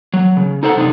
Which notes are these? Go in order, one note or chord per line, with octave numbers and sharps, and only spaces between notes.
F#3
C#3
D#4 A4 C5 F#5
F#2 C3 D4 D#4